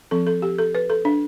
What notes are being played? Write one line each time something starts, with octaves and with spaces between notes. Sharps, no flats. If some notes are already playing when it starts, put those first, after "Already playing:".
F3 C4 A4
A4
G4
A4
B4
A4
D4